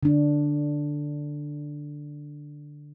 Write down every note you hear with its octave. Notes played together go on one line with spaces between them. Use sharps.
D3 D4